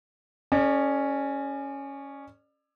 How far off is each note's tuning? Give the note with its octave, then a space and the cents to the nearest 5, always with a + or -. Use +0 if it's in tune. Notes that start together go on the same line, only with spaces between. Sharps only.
C#4 +0 A4 +0 D5 +35